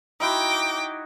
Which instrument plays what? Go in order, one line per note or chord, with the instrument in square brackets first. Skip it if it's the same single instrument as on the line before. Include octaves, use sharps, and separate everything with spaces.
[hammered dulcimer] D#4 E4 F#4 [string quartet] G5 D6